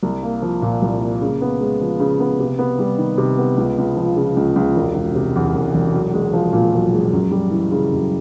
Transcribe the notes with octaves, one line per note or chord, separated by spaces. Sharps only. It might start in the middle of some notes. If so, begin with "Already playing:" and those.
C2
A#3
F3
A#2
C2
A#3
C#3
B3
G#3
F3
C#3
B3
C3
B3
G3
D#3
C3
B3
C#2
C#2
F3
C#3
C#2
C#2
E1
E1
C3
E2
E1
E1
B1
G#3
F3
A#2
B1
G#3
F#2
G3
E3
C#3
F#2